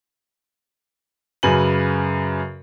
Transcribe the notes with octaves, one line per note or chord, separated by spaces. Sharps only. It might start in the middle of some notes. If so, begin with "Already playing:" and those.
F#2 C#3 B4 G#5 F#7